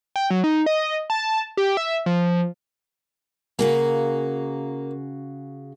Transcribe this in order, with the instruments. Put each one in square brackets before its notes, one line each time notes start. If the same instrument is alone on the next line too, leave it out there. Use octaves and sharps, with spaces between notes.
[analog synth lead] G5
F#3
D#4
D#5
A5
G4
E5
F3
[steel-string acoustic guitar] C#3 F#4 G#4 [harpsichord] A#3